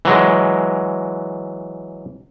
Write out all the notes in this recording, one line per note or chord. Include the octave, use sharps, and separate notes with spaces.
E3 F#3 G#3